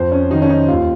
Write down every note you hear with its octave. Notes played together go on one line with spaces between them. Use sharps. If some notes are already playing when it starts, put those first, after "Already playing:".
Already playing: F2 C5
C#4
D#3 F#3 D#4
C#4
D#4
D#2 F4